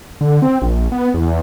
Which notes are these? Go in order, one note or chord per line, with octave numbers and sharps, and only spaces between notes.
D3
C4
A#1
B3
E2